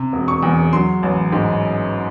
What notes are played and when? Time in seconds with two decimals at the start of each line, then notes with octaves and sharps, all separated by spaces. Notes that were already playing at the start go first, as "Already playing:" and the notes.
Already playing: C3
0.13 E1
0.28 C#6
0.43 E2
0.73 F#3 C6
1.03 A1
1.32 G#2